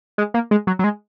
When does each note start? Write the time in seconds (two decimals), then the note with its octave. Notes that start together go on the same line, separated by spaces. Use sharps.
0.18 G#3
0.34 A#3
0.51 G#3
0.67 F#3
0.79 F#3
0.84 G#3